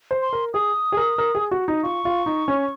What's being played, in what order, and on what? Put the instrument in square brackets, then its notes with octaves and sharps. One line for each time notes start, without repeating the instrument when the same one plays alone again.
[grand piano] C5
[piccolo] C6
[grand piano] A#4
[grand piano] G#4 [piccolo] D#6
[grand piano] G#4
A#4
A#4
G#4
F#4
D#4
[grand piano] F4 [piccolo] C#6
[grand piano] F4
D#4
C#4